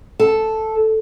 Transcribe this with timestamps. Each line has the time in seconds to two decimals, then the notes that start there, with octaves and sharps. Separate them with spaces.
0.19 A4